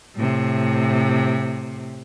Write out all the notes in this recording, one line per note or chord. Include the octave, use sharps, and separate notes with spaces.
A2 C3